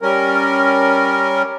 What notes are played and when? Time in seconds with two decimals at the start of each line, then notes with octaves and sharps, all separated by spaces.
0.02 G3 C#4 A#4